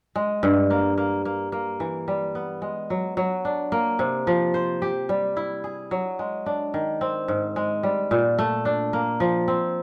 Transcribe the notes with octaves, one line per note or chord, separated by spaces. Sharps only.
G#3
G2
A#3
A#3
A#3
A#3
E3
G3
B3
G#3
F#3
F#3
D4
A#3
C3
F3
C5
G4
G3
E4
G#4
F#3
G#3
D4
D#3
C4
G#2
G#3
G3
A#2
A3
D4
A#3
F3
C4